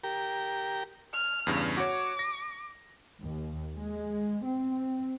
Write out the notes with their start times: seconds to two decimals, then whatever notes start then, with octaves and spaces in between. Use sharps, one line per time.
0.04 G4 A#4
1.13 F6
1.47 E2 G2 C#3
1.77 F#4 C#5 D6
2.19 A#6
3.21 D#2
3.75 G#3
4.45 C4